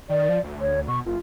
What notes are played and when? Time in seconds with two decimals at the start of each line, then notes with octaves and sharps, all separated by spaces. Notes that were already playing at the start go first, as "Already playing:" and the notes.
0.09 D#3 D5
0.29 F3
0.43 D2
0.61 C#5
0.88 B2 C#6
1.06 F#1 F4